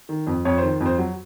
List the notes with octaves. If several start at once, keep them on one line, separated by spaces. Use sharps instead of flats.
D#3
F2
F2 C#5
D#3 C5
F2
C5
F#3